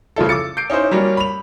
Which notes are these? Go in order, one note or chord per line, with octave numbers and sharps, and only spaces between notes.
C#3 F3 E4 A4
D6 E6 A6 C#7
G6 C7 D7
C#4 D#4 E4 C5
F#3 G3 A#3 C#4
B5 F7